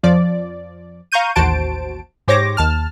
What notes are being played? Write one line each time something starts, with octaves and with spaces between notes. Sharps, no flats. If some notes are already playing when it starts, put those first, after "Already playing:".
F2 F3 D5
F5 A#5 C#6 G6 D#7
A1 D#2 F#4 C5 A5 D7
G#2 G4 C5 C#5 D6 A#6
D#2 A5 F6